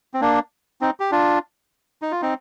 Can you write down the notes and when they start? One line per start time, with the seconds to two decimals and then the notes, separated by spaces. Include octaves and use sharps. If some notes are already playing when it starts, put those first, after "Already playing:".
0.14 C4
0.21 A#3 D4
0.81 C4 D#4
1.00 G4
1.11 D4 F4
2.02 D#4
2.11 F4
2.22 C4 D#4